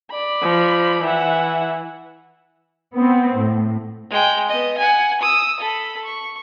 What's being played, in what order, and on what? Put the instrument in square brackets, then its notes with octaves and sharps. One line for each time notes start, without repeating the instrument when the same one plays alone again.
[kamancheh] D5 B5
[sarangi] F3
[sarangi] E3 [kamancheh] E5 F#5
[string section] B3 C4
A2
[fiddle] G#3 G5
B3 D#5
F#5 G#5
D#6 E6
A4 B5
C#6